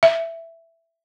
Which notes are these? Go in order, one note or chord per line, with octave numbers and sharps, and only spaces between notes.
E5